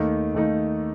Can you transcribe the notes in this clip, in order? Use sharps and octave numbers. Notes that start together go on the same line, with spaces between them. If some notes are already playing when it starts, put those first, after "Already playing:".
Already playing: D#2 D#3 A3 D#4
D#2 D#3 A3 D#4